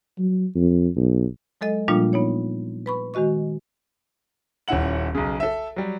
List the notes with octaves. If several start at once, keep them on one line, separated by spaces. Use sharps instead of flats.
F#3
F2
B1
F#3 G#3 A4 D#5
A#2 F3 G3 A#3 D4 F4
B3 D#4 C#5
B4 B5 C#6
D#3 G#3 F#4 D#5 C#6
D#1 C#4 E4 E5 F#5 F#7
B1 C#3
A4 E5
F#3 G3